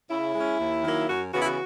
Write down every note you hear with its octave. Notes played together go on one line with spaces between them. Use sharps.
C#3 E4
G#3 C#4
D#2
D#3 F#3 A#3
F#2 F#4
C#3 E3 B3 F#4
E4
F#4